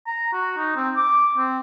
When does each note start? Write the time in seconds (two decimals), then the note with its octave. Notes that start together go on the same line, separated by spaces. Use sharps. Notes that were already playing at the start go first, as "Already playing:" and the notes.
0.06 A#5
0.33 F#4
0.58 D#4
0.76 C4
0.96 D6
1.37 C4